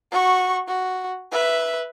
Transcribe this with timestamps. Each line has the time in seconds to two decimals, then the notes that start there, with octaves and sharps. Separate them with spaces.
0.11 F#4 C#6
0.68 F#4
1.32 B4 E5